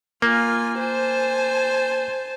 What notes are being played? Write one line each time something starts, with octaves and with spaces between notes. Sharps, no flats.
A#3 F4 G#5
C5 G#5 A5